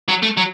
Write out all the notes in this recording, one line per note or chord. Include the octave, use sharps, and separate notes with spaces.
F#3
A3
F#3